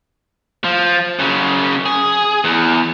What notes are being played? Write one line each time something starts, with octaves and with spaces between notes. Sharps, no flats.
F3
F#2 C#3
G#4
E2